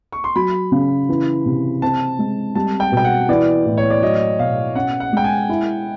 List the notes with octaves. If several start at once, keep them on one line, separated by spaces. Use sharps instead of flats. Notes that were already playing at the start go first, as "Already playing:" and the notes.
C#6
C6
F#3 B5
C#3
E3
C3
C4 A5
G#3
G3 A5
G5
B2
G5
F#5
E3 D5
A2
C#5
D5
F#3 D#5
B2 F5
C#4 F#5
F#5
G#3 G5
G#5
E4